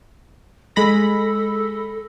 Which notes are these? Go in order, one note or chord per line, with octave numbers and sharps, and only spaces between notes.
G#3 A4 B5 A#6